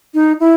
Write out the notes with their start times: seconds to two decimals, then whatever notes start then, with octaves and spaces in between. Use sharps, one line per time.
0.14 D#4
0.40 E4